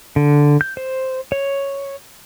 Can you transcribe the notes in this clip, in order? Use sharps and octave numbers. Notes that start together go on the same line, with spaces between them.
D3
G6
C5
C#5